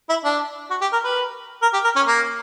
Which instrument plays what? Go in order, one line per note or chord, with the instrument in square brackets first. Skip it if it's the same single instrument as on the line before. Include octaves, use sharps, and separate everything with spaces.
[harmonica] E4
D4
F#4
G4
A#4
B4
A#4
G4
A#4
C#4
A#3